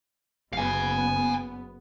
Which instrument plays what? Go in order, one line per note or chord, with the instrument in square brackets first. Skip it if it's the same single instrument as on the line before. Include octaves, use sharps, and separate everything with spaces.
[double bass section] F#1 B3 [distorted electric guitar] F5 G#5